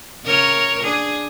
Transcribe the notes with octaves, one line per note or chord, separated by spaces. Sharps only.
C#3 A#4 C#5
D4 G#4